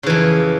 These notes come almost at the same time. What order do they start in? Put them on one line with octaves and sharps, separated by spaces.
C#3 E3 F2